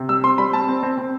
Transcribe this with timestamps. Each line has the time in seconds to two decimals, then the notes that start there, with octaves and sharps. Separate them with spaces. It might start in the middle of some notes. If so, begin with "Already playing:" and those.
Already playing: C3
0.09 G3 E6
0.23 C4 C6
0.38 G3 B5
0.53 C4 A5
0.68 C4
0.83 C4
0.98 C4